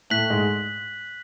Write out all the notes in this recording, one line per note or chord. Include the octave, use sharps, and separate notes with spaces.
A2 A3 F#6 B6 F#7
G#2 G#3